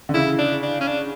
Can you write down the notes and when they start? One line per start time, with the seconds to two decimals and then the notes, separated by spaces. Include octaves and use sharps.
0.09 D3
0.14 C#3 E4
0.39 D4
0.63 D4
0.81 C#4
0.87 D4